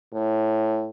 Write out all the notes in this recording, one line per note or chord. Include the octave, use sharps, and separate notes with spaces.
A2